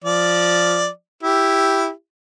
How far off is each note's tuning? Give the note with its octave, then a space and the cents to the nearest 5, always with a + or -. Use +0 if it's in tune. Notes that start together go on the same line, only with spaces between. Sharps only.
F3 +0 D5 +0
E4 +0 G4 +0